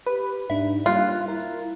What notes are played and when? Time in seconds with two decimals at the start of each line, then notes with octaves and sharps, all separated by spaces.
0.06 G4 B4 B5
0.50 G#2 D4 D#4 E5
0.86 G3 A#3 F4 F5 F#6
1.28 E4 A#4